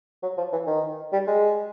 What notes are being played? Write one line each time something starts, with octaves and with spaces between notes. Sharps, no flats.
F#3
F3
E3
D#3
G3
G#3